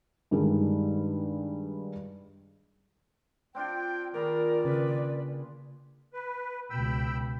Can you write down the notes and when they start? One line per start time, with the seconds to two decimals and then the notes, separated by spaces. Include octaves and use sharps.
0.31 G2 D#3 G3 G#3
3.55 C4 D4 F4 G5
4.14 A#2 D#3 G#4 A#4 D5 B5
4.65 C#3 B4
6.13 B4
6.70 C#2 B2 G5 B5 E6